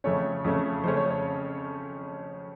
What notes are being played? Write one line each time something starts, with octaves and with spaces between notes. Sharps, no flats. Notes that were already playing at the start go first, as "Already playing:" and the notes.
F2 C#3 A3 C#4 C#5
F2 C#3 A3 C#4
F2 C#3 A3 C#4 C5
C#5
C#5